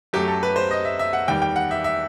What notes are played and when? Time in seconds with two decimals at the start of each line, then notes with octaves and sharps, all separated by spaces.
0.13 F#2 F#3 A3 G4
0.28 A4
0.43 B4
0.56 C5
0.71 D#5
0.85 E5
0.99 E5
1.13 F#5
1.28 E2 D#3 G3 G5
1.42 G5
1.56 F#5
1.71 E5
1.84 E5